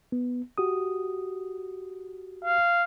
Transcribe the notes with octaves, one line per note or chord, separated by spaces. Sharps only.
B3
F#4 G4 D#6
F5